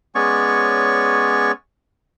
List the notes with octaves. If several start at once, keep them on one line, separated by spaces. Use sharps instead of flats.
G#3 B3 C#4 C#5 D5 C#6